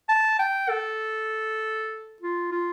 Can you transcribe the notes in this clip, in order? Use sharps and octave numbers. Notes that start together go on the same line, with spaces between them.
A5
G5
A4
F4
F4